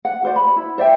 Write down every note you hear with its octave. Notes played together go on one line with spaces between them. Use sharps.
F#5
F#4 C5 D5
B5
E4
C5 D5 E5 G5